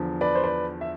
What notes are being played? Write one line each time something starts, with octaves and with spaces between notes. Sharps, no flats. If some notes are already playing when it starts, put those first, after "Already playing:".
Already playing: E2 D3 F3
B4 D5
C5
B4 D5
E5